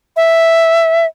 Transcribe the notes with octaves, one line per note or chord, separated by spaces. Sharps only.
E5